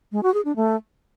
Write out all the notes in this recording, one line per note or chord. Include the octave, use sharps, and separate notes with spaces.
G#3
F#4
G#4
D4
A3